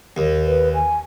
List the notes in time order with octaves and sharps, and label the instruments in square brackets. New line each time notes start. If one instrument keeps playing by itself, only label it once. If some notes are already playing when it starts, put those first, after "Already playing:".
[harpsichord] D#2
[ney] B4
G#5